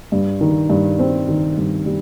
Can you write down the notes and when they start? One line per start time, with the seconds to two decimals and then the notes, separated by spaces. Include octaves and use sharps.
0.12 G2
0.41 D#3
0.70 G2
0.99 C4
1.28 D#3
1.57 G2
1.86 G3